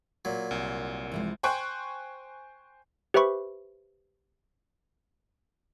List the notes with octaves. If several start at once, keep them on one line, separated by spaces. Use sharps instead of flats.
A#2 F#3
C2
E3 F3 G#3
C5 G5 G#5 C#6 F#6
G4 B4 C5 E5 B5 C#6